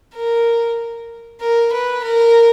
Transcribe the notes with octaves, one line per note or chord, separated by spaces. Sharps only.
A#4
A#4
B4
A#4